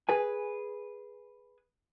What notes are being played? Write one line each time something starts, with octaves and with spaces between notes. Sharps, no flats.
G#4 B4 G#5